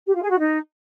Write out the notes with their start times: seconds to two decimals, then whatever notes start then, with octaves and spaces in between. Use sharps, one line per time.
0.06 G4
0.14 F4
0.22 G#4
0.30 F#4
0.38 D#4